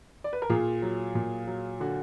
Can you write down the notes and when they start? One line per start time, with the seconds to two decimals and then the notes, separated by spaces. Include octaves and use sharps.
0.24 D5
0.33 B4
0.42 A#4
0.50 A#2 F4 G#4
0.82 F#3
1.15 A#2
1.47 F#3
1.80 D3 F#4